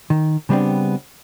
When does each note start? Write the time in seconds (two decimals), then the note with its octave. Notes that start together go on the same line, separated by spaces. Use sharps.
0.10 D#3
0.49 C#3 G3 B3 C4 D4